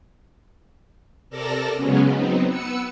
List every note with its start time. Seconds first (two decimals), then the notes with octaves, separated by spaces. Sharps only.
1.30 C3 A4 A#4 D5 A5 A#6
1.75 C#3 F#3 G#3 B3 C#4
2.12 F#3 B3 C4 D#4
2.47 B3 B4 E6 C#7